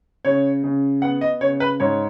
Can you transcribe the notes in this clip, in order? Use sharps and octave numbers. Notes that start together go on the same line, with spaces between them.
C#3 C#5
C#3
B3 F#5
D#5
C#3 C#5
B4
G#2 C#5